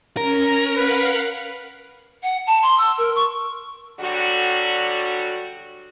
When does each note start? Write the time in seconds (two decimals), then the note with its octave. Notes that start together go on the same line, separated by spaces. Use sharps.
0.17 C#4 A#4
0.76 B4 F5 F#5 B5
2.23 F#5
2.46 A5
2.62 C6
2.78 E6
2.98 A#4
3.15 C#6
4.00 D3 F#3 G3 F#4